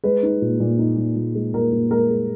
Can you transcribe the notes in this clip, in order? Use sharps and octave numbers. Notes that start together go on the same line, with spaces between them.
G#3 B4
D#4
A#2
A#2
D#4
A#2
A#2
G#3
A#2 A#4
A#2
G#3 A#4
G#3